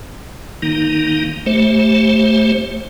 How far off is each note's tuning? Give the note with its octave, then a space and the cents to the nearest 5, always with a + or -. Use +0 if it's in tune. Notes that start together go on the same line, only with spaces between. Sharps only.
D#3 +0 A#3 +5 D#4 +0
A3 +0 G4 +0 C5 +25